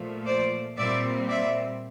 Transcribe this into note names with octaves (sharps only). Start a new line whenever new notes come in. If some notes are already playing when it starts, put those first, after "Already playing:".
Already playing: A#2 F3 A3
C5 D5
A#2 G3 C4 D5 E5
D5 E5